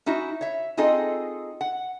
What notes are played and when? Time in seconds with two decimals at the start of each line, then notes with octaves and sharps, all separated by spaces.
0.06 C#4 D#4 E4 F#4
0.41 C#5 E5
0.77 C4 D#4 F4 G#4 A4 D#5
1.61 F#5